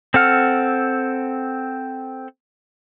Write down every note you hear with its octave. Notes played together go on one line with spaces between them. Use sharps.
C4 A4 F#5 F6